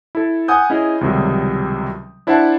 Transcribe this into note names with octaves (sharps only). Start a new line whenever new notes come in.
E4 A4
F#5 G#5 D#6 G6
C#4 E4 G#4 D#5
C#2 C3 D#3 F#3 G3
D4 E4 C5 E5 F#5 A5